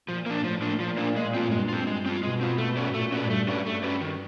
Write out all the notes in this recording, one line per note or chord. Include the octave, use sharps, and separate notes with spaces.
A#2 F3
A#3 D4
A2 F3
A#3 D4
A#2 F3
A#3 D4
G#3
C4 F4
G2 G#3
C4 F4
G#3
C4 F4
B2 G#3
C4 F4
A3
C#4 F#4 B4 D5
A#2 A3
C#4 F#4 B4 D5
G2 A3
C#4 F#4 B4 D5
A3
C#4 F#4 B4 D5
D#3